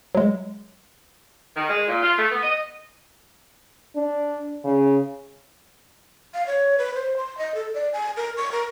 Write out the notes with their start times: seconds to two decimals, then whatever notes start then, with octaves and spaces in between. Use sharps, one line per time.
0.15 F#3 G#3
1.57 D#3
1.69 G#3
1.88 A#2
2.02 F4
2.18 A3
2.31 B3
2.42 D#5
3.96 D4
4.64 C#3
6.34 F5
6.47 C#5
6.78 B4
6.94 C5
7.17 C6
7.38 D#5
7.55 A4
7.74 D5
7.93 G#5
8.17 A#4
8.37 C#6
8.52 A#4